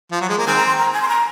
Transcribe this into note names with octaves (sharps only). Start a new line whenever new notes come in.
F3
F#3
G#3
A#3
D#3 G#3 C4 G#5
A#5
C6
A#5
G#5
C6
A#5